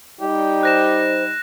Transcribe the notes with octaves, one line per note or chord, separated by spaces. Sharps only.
G3 D#4 G4
C5 F#6 A#6 E7